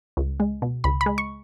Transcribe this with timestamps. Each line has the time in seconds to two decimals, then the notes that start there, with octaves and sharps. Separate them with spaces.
0.17 C#2
0.40 G#3
0.62 B2
0.84 C#2 B5
1.01 B5
1.06 G#3
1.18 C#6